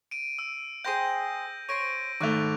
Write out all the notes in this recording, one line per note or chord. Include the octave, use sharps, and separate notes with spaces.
D7 D#7
E6
G#4 C5 G5 G6 A#6
C5 C#5 A#6 D7 D#7
G#1 A3 D5 C#6 F#6 F7